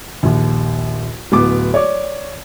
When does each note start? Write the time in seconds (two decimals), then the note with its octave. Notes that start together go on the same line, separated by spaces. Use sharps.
0.23 A#1 D#2
1.32 D1 B3 D6
1.74 C#5 D5 D6